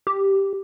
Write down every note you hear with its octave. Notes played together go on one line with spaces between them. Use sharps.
G4